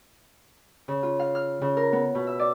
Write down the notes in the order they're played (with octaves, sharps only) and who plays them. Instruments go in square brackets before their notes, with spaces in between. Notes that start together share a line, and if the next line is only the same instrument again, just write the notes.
[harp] C#3
F4
F5
F6
C#3
A#4
B3
B2
E5
D5